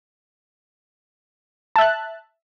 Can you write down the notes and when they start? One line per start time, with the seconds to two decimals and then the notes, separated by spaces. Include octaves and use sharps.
1.76 A5
1.78 E5
1.81 F#6